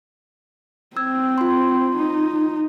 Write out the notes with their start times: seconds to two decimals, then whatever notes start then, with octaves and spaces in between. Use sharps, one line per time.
0.97 C4 E6 G#6
1.38 F4 C6
1.96 D#4